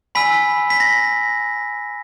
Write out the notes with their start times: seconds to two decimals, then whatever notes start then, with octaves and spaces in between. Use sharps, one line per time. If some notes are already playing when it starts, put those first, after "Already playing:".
0.15 G#5 B5 E6 B6
0.70 B6
0.80 A#6